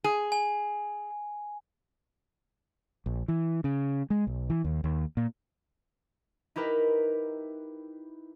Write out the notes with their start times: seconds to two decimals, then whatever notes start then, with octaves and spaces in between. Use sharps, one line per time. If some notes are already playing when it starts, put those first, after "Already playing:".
0.04 G#4
0.32 G#5
3.06 A#1
3.28 E3
3.64 C#3
4.10 G#3
4.27 B1
4.50 E3
4.64 D#2
4.84 D#2
5.17 A#2
6.56 D#4 E4 G4 A#4 B4